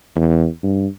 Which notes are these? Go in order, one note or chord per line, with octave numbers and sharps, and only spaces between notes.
E2
G2